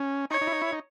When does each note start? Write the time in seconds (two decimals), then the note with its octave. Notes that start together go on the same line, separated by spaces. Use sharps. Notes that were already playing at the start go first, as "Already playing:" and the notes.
Already playing: C#4
0.31 D#4 C#5
0.41 D#4
0.47 E4
0.52 D#4
0.62 E4
0.72 D#4